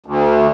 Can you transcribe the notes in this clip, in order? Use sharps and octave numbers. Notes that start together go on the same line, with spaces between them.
D2